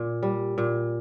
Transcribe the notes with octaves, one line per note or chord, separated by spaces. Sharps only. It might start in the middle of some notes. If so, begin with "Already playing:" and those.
Already playing: A#2
G3
A#2